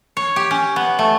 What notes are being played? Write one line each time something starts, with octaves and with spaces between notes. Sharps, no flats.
C#5
G4
C#4
B3
A3